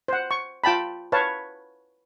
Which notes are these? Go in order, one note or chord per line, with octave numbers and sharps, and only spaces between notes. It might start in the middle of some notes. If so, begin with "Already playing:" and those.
C5 F#5
C#6
F4 G5 A5 B5
B4 C#5 F5 A5